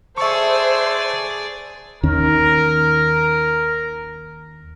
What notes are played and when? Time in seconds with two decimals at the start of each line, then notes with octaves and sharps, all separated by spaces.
0.18 G#4 A4 C5 D5 E5 C#6
2.03 D#2 D#3 C#4 A#4